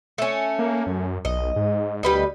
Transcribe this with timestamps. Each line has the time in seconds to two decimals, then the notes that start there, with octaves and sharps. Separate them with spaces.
0.18 A3 C#4
0.59 A#3
0.87 F#2
1.25 B1 D#5
1.56 G#2
2.03 D2 G3 B4 D#5